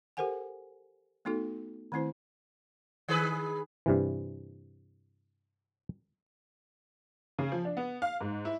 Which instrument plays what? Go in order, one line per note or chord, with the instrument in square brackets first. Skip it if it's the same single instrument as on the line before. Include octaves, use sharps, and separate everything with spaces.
[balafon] G4 A4 A#4 C5 F#5 G#5
A3 B3 D#4 F#4 A4
D#3 A3 C4 E4 C5
[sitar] D#3 G#4 B4
[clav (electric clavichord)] G2 C3 E3
[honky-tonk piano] C#3
F3
D4
B3
F5
G#2
E4